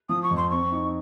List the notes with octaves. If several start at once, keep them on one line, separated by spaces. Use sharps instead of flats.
F3 D#6
C#6
F2
C6
C4 C#6
D#4